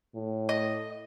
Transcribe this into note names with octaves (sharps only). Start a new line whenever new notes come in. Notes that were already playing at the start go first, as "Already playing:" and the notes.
A2
D#5